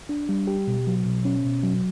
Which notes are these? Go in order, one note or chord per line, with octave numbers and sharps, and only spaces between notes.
D4
G3
G4
B2
F#3
B2
C#4
B2
F#3